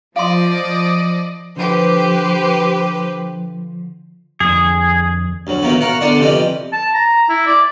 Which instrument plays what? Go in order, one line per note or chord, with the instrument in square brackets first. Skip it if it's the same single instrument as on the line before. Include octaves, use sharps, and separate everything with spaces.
[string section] F3 [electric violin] D5 D#5 [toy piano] F5 C6
[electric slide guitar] D3 F3 [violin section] G4 B4 C5
[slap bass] F2 D3 [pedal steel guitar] G#4
[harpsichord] D2 F#3
D#3 E3 F#3 A#3 B3
F#4 A#4 F5 F#5
E2 D3 D4 D5 F#5 A5
C2 F2 E3 G4 D5 D#5
[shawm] A5
A#5
E4
D5